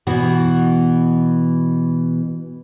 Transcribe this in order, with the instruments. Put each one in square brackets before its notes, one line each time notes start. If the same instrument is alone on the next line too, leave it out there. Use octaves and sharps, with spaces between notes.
[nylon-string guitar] B2 E3 B3 F#4